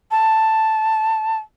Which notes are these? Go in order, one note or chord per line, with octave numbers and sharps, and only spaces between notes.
A5